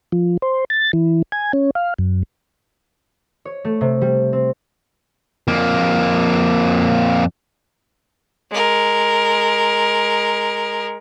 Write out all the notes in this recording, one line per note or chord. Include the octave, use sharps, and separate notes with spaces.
F3
C5
A6
E3
G#5
C#4
F5
F#2
C#5
A3
C3
G3
C4
F2 A#3
G#3 A#4